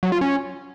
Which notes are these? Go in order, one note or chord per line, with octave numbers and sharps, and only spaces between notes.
F#3
F4
C#4